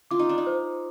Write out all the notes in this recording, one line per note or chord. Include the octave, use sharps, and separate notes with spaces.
F4 D6
D#4
D4
D#4
C5